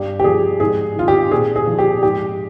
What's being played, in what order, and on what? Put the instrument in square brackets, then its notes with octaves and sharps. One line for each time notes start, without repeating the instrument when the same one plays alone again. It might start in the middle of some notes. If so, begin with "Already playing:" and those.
Already playing: [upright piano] G2 G4
G4
F3 G#4
G#2 G#4
D#3 F4
G4
A#2 G#4
G#4
F3
G4
G#2 G4